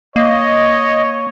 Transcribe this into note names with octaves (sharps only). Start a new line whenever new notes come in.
A#3 C#5 D#5